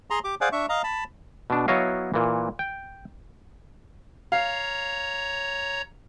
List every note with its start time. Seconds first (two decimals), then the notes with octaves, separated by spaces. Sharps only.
0.10 G#4 A#5 C6
0.24 G4 D6
0.41 G#4 C5 D5 F5 F#5 G#5
0.52 D4 E5 C#6
0.69 D#5 F5 A#5
0.84 A5 B5
1.50 B2 D4
1.68 F#3 B3 E4 C#5 D#5 F5
2.14 A#2 E3
2.59 G5
4.32 C#5 F5 A#5